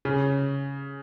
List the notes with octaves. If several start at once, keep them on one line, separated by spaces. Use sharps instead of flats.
C#3